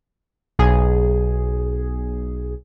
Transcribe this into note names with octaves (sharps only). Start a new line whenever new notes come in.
B1 G#4